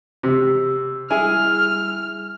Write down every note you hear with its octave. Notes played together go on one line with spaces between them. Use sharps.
C3 E6
G3 E4 G#4 G#5 E6 F6